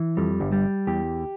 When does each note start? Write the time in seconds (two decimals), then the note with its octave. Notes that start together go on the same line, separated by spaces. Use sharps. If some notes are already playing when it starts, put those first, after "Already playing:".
Already playing: E3
0.17 F2 G3
0.40 G1 G2
0.52 G3
0.87 E2 G4